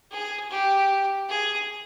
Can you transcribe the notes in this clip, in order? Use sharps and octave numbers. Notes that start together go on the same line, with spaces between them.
G#4
G4
G#4